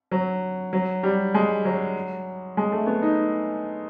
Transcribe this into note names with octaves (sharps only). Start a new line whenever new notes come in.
F#3
F#3
G3
G#3
F#3
G#3
A3
B3
D#4